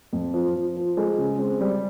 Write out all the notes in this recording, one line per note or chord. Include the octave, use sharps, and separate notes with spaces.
F2
F3
F3
F3
G#3
C#3
C4
G3